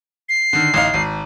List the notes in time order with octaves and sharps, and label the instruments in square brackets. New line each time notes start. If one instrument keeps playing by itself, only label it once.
[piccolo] C7
[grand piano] D3 D#3
A1 D#4 F5
G#1